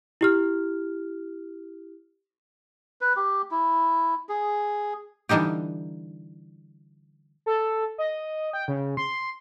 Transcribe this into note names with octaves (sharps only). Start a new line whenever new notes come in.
E4 G4 F6
B4
G4
E4
G#4
D3 E3 G3 D#4 G4
A4
D#5
G5
C#3
C6